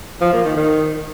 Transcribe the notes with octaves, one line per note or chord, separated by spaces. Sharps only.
F3
A#3
D#3
D#3